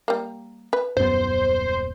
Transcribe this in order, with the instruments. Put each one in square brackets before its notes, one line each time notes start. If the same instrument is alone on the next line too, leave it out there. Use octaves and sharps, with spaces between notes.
[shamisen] G3 A#3
B4
[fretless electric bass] D#1 F#2 B3 [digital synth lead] C5